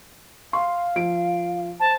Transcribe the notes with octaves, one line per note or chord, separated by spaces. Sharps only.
F5 C6
F3 D7
C5 A5